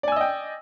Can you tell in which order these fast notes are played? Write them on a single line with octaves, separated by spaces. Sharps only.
D5 G#5 E6 D#5 G5